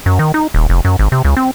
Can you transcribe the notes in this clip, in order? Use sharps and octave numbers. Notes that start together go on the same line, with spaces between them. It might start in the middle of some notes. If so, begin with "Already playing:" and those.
F#2
D#3
D#4
D#1
F1
F#2
G#1
C3
C#2
C4